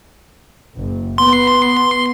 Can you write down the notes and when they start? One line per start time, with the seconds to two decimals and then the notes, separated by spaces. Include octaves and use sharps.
0.75 F#1
1.18 B3 C6